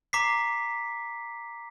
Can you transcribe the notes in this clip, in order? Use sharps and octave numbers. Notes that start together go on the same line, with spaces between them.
A#5 D6 B6 C7